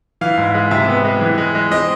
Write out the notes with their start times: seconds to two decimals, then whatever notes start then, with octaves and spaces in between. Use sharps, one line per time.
0.21 E3 F5
0.38 G#2
0.54 G#3
0.71 C3 E5
0.88 B3
1.05 G#3
1.21 E3
1.38 G#3
1.55 G#3
1.71 C4 D#5